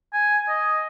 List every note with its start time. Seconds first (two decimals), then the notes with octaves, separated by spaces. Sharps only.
0.13 G#5
0.49 D#5